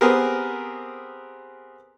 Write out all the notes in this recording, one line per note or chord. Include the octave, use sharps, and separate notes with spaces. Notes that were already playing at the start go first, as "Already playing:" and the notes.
B3 C4 G4 G#4 A#4